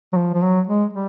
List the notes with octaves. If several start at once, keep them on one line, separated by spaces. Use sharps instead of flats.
F#3
F3
F3
F#3
G#3
G3